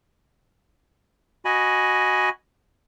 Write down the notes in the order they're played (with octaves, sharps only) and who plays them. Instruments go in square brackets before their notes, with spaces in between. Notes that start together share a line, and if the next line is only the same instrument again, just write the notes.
[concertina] F#4 D#5 G#5 B5